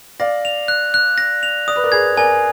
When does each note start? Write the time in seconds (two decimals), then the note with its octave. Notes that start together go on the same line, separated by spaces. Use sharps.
0.20 D5 F5 A#6
0.45 F7
0.68 F#6
0.94 F#6
1.18 A#6
1.43 F7
1.68 D5 D#6
1.76 B4
1.84 A#4 D5
1.92 G#4 B4 G#6
2.17 A#4 D5 G#5